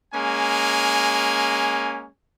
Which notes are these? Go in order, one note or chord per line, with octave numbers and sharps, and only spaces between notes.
G#3 A#3 C#4 G#5